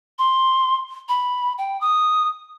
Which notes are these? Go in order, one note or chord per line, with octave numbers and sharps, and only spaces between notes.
C6
B5
G5
D#6